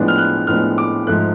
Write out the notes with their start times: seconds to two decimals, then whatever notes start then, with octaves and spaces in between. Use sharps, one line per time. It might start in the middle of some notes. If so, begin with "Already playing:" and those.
Already playing: A2 F3 G#3 B3 D4
0.08 F6
0.18 F#6
0.47 A2 F3 G#3 B3 D4 F6
0.78 D6
1.07 G#2 F3 A3 F#6